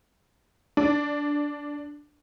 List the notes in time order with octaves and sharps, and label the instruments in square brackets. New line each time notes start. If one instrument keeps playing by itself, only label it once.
[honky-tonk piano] D4